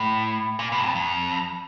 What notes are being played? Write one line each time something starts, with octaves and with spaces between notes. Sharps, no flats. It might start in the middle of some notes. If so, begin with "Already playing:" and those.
Already playing: A2
A#2
B2
F2
F2